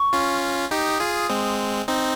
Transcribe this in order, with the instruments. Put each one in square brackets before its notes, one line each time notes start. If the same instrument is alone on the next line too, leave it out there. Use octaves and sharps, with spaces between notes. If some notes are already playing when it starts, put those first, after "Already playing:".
Already playing: [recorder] C#6
[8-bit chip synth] C#4 F4
[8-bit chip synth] D#4 G4 [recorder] D#6
[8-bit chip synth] F4 G#4
G#3 C4
C4 D#4